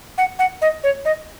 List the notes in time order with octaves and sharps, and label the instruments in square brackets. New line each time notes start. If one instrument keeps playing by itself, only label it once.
[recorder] F#5
F#5
D#5
C#5
D#5